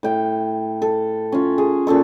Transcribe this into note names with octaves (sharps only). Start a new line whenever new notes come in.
A2 G5
A4
C#4 F4
G#4
A#2 C#4 A4 C#6